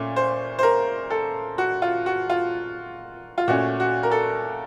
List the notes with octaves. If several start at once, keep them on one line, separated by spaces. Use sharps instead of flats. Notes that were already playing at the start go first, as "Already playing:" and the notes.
Already playing: A#2 A3 C#4
C5
C5
A#4
A4
F#4
F4
F#4
F4
F4
A#2 A3 C#4 F#4
F#4
A#4
A4